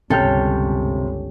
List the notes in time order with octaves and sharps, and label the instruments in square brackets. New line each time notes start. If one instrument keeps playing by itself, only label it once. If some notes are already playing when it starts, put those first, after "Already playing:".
[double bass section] G1 C#2 G2 [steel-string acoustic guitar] C3 [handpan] C#4 [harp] A4 G5 F6